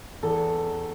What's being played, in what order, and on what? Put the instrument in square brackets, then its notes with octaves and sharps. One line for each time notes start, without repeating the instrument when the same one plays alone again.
[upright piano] E2 A4